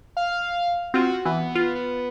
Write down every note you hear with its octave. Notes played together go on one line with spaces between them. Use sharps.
F5
C4 F4 F#4
E3 B3
F4
B3